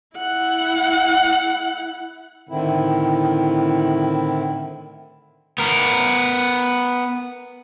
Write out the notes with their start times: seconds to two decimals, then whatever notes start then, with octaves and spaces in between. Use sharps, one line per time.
0.17 E4 F#5
2.49 A2 D3 D#3 C4 E4
5.58 B3 A#4